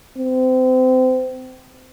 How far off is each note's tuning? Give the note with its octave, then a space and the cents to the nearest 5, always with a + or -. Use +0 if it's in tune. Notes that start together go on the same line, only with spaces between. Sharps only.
C4 -30